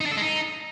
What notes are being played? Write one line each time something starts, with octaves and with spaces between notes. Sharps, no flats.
D#4
D4
A4
G#3
D#4